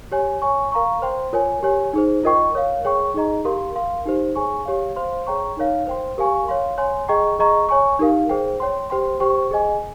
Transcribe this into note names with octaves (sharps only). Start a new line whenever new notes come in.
G4 C#5 G#5
C#5 G#5 C#6
A#4 F5 A#5 C#6
C5 G5 C6
F4 A#4 C#5 G#5
G4 C#5 G#5
D#4 G#4 C5
F4 A#4 D#5 G5 C#6
A#4 C#5 F5
G#4 C#5 G5 C#6
D#4 G#4 D#5 A#5
G4 A#4 F5 C6
A#4 F5 C6
D#4 G4 C5
G#4 C#5 G#5 C#6
G4 C#5 F5
C5 F5 C6
G#4 C#5 G5 A#5 C#6
D#4 A#4 C#5 F5
C5 G5 C6
G4 A#4 F5 G#5 C#6
C#5 F5 C6
C#5 G#5 C6
G#4 D#5 G5 A#5 C#6
G#4 D#5 A#5 C#6
C#5 G#5 C#6
D#4 G4 A#4 F5
G#4 C5 G5
C#5 G5 C6
G4 C5 G5 C6
G4 C5 G5 C#6
G#4 D#5 G#5